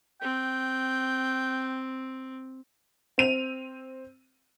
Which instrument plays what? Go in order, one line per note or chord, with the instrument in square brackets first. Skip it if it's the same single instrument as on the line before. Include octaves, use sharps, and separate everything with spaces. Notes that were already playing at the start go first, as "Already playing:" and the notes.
[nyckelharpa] C4 [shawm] G5
[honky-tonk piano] C4 D#7 F7